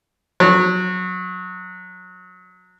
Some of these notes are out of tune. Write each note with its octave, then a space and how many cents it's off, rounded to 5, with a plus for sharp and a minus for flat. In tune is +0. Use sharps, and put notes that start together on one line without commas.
F#3 -20